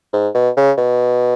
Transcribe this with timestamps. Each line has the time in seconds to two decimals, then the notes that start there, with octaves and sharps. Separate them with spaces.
0.13 G#2
0.34 B2
0.57 C#3
0.78 B2